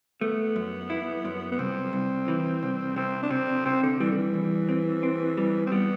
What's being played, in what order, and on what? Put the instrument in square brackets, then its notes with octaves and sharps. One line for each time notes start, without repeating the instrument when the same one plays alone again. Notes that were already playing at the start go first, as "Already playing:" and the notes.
[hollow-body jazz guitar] A3 [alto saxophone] B3
[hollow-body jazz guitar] F#2
E4
F#2
[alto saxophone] B3
[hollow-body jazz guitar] C2 [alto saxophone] C4
[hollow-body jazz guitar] C2
E3
C2
[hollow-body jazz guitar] C3 [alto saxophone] C4
[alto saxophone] D4
[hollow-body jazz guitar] C3 [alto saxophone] C4
[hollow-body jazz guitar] C3 [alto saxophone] C4
[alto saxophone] D3
[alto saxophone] E3 [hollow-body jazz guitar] G3
[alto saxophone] D3
E3
[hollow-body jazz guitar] E2
C4
C4
G3
[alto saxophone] C4
[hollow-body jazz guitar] G3 [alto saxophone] B3